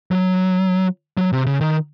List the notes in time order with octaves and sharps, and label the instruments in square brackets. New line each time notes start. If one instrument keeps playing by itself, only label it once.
[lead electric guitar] F#3
F#3
C3
C#3
D#3